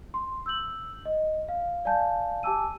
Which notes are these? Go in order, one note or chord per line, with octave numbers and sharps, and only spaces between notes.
C6
E6 G6 F#7
D#5
F5
D5 F5 G#5 A5 G6
G4 G#5 A5 D6 E6 D#7